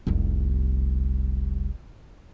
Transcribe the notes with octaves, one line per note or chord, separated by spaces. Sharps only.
F1 C2